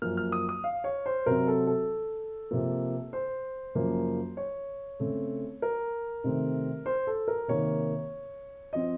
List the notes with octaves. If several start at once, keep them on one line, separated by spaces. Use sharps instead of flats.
F#2 F3 A#3 F6
F6
D#6
D#6
F5
C#5
C5
C3 F#3 C4 A#4
A4
A4
C3 F3 A#3
C5
F#2 C#3 F3 A#3
C#5
C#3 A3 C4
A#4
C3 D#3 A3 C4
C5
A4
A#4
C3 D#3 A#3 C#5
F3 C4 D#5